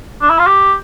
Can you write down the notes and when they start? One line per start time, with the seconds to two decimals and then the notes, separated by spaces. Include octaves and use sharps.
0.22 D4
0.30 E4
0.39 F4
0.47 G4